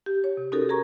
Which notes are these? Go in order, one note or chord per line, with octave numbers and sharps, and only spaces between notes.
G4
C#5
C3
C#4 D#4 F#4 G4 A4 A#4
G#4 A#4 A#5 C#6